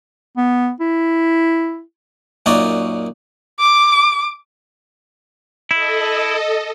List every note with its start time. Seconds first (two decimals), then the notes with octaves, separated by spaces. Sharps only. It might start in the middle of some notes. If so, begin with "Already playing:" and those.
0.37 B3
0.80 E4
2.46 F#2 A#2 D#4 F#4 D5
3.60 D6
5.71 E4 A4 D#5